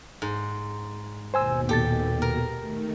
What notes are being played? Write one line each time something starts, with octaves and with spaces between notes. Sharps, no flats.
G#2
D#2 B2 C5 G#5 E6
A#2 G4 A4 A6
A#4
D#3 A3